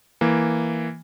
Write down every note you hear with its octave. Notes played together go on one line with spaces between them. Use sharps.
E3 A#3